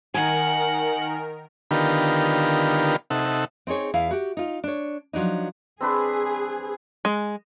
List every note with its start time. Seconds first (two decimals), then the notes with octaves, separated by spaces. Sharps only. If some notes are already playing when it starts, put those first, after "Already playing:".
0.14 D#3 A#4 F#5 G#5
1.71 D3 D#3 B3 F4 G4 A#4
3.10 C3 D#4 A4 E5 F#5
3.67 C4 D#4 G#4 C#5
3.94 E2 E4 F5
4.11 F#4 G4
4.37 D#4 F4
4.64 D4 C#5
5.13 F3 F#3 D4 D#4
5.81 C4 D4 G#4 B4
7.05 G#3